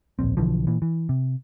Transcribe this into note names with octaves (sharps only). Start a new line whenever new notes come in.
D1 A#1 C4
B1 D3 E3 F3
A#2 E3
E3
C3